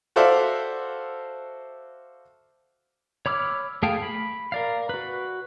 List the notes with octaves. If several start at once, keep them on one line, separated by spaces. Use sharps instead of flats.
F#4 A4 C5 D5 E5 F5
C#5 B5 D6 E6 F6
A3 G#4 F5 G5 A5
B5
A#4 D5 F5
F#4 B4